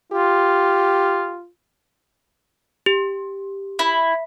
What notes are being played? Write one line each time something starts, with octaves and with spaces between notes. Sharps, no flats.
F4 G4
G4
E4